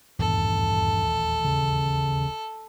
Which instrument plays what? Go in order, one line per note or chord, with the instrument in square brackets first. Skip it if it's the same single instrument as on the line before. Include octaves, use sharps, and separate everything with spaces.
[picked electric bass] D#1 A1 E2 [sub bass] G2 [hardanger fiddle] A4
[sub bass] C#3